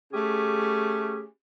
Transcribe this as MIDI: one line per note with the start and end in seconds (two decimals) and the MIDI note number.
0.13 1.24 57
0.13 1.24 61
0.13 1.24 67
0.13 1.24 68